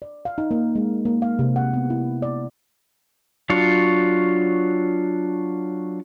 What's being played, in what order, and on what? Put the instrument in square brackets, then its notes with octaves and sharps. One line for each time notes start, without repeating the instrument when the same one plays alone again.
[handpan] D5
F5
D#4
A#3
G#3
A#3
F5
C3
F#5
B3
E4
D5
[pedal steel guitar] F#3 D4 F4 C#5